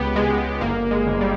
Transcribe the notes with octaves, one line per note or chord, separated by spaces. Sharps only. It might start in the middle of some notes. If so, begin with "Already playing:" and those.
Already playing: C#2 B3 G4
C#2 G#3
G#3
G1 A#3
G#3
G1
G3